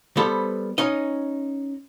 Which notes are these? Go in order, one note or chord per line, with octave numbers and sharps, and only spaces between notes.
G3 B3 A4 C5
C#4 D#4 D#5